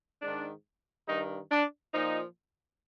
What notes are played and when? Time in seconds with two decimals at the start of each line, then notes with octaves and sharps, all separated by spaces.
0.22 G#2 D#3 D4
1.08 G2 D#3 D#4
1.51 D4
1.93 A#2 F3 D#4